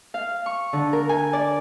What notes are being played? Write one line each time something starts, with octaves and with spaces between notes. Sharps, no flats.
F5
C#6
D3
A#4
G#5
D5